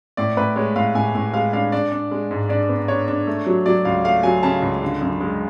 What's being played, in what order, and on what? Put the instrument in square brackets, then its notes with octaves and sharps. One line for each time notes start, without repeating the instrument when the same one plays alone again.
[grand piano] A2 D5
A2 B4
G#3 C#5
A2 F5
A2 G#5
A2
G#3 F5
D4 F5
D4 D5
D4
G#3
G#2
D4 D5
B3
D4 C#5
D4
A3
F#3
F#3 D5
C#2 F5
A3 F5
F#3 G#5
C#3 A5
C#2
D3
F#2
G#3